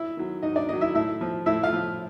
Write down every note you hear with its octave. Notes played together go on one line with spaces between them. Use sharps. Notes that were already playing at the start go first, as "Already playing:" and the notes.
Already playing: E4 E5
D#3 F#3
G#2 D#4 D#5
D4 D5
D#3 F#3 D#4 D#5
E4 E5
A2 E4 E5
F3
A2 E4 E5
F4 F5
F3